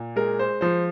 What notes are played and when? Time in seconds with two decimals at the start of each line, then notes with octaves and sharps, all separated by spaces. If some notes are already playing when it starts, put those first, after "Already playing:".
Already playing: A#2
0.16 G#3 A#4
0.39 C5
0.61 F3 C5